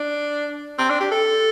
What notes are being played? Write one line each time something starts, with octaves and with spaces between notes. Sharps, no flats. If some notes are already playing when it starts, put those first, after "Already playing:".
Already playing: D4
C4
D4
G4
A4